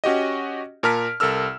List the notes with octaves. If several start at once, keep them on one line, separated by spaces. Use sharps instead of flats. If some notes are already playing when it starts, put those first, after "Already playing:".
C#4 F#4 G4 D#5
A#2 A#4 A5 F6 B6 D7
C2 A4 A#4 E6 F6